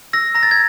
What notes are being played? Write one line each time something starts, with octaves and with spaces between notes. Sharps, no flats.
E6 A#6
A#5 A#6
A6
G#6